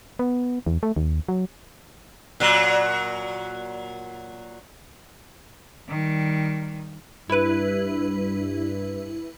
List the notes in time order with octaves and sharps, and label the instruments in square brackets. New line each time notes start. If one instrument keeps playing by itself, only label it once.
[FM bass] B3
E2
A3
D#2
F#3
[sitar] A#2 F#3
[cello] D#3 G3
[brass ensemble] G2 [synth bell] E4 B4